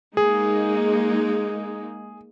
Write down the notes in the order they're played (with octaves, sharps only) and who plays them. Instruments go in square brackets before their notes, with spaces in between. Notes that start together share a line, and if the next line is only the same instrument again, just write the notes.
[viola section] G#3 A#3 D#4 [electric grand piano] G#4